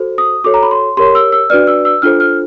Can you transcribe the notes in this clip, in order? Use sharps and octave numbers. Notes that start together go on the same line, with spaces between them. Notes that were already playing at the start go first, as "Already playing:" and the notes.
Already playing: F#4 A4 C5
D#6
F#4 A4 C#5 D6
A#5
B5
C6
G4 A#4 C#5 C6
E6
E6
D4 F#4 B4 D5 F6
E6
E6
D4 F4 A4 C5 F6
F6